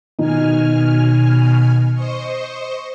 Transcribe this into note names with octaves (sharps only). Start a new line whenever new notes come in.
B2 D#3 D#4 G#5 F6
C5 D#5 C#6